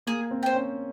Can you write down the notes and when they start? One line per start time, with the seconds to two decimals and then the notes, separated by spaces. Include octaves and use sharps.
0.07 A#3 G#4
0.31 C4
0.43 C5 G5
0.55 C#4